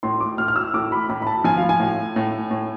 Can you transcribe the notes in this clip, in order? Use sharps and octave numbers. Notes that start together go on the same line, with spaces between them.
A2 C6
D6
A2 F6
F6
E6
A2 D6
B5
A2 B5
B5
A5
F3 G#5
F5
G#5
A2
A2
A2